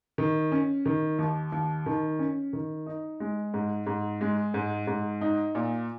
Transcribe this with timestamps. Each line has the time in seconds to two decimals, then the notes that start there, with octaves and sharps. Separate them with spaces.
0.18 D#3
0.52 C#4
0.86 D#3
1.19 D#2
1.52 D#2
1.86 D#3
2.19 C#4
2.53 D#3
2.86 D#4
3.20 G#3
3.54 G#2
3.87 G#2
4.21 G#3
4.54 G#2
4.87 G#2
5.21 D#4
5.55 A#2